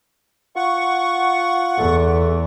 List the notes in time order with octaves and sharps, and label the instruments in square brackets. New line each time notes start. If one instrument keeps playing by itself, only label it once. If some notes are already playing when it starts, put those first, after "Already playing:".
[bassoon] F4 [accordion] F#5 C#6
[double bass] E2 [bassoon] A3